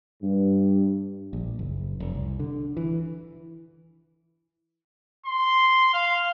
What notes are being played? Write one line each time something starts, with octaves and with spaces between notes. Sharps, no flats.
G2
A#1
F#1
F1
C2
D3
E3
C6
F5